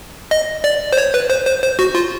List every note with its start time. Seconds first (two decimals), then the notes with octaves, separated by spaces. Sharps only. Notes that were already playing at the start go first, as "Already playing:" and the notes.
0.31 D#5
0.64 D5
0.92 C5
0.98 C#5
1.14 B4
1.30 C5
1.46 C5
1.62 C5
1.79 F#4
1.95 F4